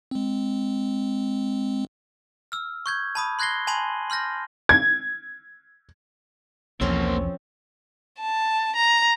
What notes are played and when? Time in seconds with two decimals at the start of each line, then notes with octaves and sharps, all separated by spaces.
0.11 G#3 C4
2.52 E6 F6
2.86 C#6 G6 G#6
3.15 A5 B5 D#6
3.39 C6 F#6 G#6 A#6 C7 G7
3.67 G#5 A5 B5 C6 D#7 F#7
4.10 C6 F6 G6 A#6
4.69 G#6
6.81 B1 E2 F3 A#3 C4 C#4 A4 C5
8.20 A5
8.76 A#5